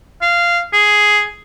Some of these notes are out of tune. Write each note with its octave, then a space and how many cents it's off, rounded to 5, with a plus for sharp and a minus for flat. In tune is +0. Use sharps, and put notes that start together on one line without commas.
F5 -10
G#4 +5